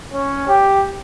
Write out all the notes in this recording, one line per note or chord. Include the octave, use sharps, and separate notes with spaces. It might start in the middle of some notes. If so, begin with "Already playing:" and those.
C#4
G4